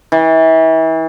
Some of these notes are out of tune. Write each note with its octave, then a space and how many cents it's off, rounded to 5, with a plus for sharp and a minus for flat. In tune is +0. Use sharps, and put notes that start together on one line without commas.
E3 -35